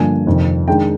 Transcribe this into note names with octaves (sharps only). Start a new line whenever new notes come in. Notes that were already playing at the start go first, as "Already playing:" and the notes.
Already playing: G2 D3 F3 A#3 D4 G#5
F2 C3 D#3
D#3 G#3 D4 G5